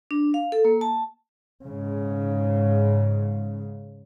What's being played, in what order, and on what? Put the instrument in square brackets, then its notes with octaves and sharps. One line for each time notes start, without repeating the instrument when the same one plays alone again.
[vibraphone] D4
F5
A4
A#3
A5
[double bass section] G#2 C#3